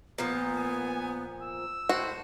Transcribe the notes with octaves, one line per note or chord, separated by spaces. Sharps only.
A#2 F3 B3
G#5
E6
A2 F#4 C5